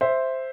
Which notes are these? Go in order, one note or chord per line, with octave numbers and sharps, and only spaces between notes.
C5 E5